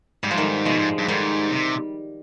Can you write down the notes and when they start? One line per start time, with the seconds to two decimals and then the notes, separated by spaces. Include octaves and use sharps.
0.23 G#2 G3
0.31 F3
0.38 D#3 G3
0.65 B2 F3 G#3
0.77 G#2
0.98 G2
1.08 G#2 D#3 G3
1.51 C3